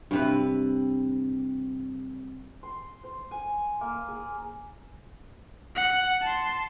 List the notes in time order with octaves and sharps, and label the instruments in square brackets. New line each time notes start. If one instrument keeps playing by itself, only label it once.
[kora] G2 C3 B4
[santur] C6
C5
G#5
A#3
G#4
[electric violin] F#5
A5 C6